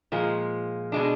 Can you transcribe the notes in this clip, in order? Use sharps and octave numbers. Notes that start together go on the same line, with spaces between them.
A#2 F3 G#3
B2 G#3 D4